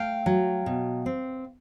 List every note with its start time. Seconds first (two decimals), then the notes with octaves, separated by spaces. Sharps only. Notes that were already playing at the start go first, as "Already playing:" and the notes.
Already playing: A3 F5 G5
0.26 F#3
0.66 B2
1.06 C4